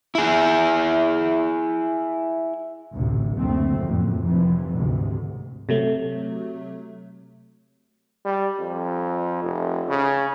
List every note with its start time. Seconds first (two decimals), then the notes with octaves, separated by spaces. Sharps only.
0.15 E4 G#4
2.93 A1 D2 C3
3.37 F#1 D2 A3 C4
3.79 F#1 F2 A2
4.24 F1 F2 E3
4.75 D2 G#2 C3
5.69 C3 F#3 A3
8.25 G3
8.59 F2
9.43 F1
9.89 C#3